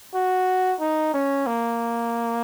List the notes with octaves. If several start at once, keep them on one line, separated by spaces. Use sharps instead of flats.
F#4
D#4
C#4
A#3